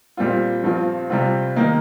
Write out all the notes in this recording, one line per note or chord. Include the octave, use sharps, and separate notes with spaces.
A#2 G3 C4 F4
G2 F3 C4 F4
C3 G3 C4 F4
D#3 A#3 D#4